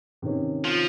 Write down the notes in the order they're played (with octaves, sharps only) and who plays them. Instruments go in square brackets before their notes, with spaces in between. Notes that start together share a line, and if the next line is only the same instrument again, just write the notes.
[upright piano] C3 D#3 C#4
[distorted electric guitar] F3